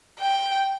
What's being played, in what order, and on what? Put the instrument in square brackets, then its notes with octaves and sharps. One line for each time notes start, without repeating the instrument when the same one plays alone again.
[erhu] G5